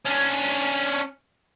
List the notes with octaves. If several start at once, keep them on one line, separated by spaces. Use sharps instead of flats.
C#4 D4